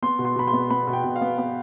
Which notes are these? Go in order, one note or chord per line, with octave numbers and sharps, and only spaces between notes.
B3 C6
B2
C6
B2 B5
C6
B3
B3 B5
B2
G5
B2
F5
B3
B3